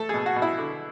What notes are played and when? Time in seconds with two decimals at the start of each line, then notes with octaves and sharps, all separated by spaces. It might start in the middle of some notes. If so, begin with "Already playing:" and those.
Already playing: A3 A4
0.09 B2 G#4
0.26 F#4
0.36 B2
0.42 E4
0.58 D3